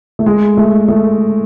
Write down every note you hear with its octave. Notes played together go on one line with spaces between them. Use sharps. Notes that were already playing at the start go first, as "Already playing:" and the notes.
A3
G#3
A3
A3